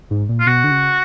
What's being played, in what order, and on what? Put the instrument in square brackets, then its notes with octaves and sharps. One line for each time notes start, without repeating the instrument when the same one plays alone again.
[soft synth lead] G#2
A#2
[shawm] F4
[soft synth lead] B2 [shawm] F#4
[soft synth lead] D3
C#3